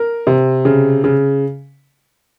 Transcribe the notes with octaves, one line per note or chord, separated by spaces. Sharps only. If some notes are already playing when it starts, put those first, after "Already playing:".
Already playing: A#4
C3
C#3
C#3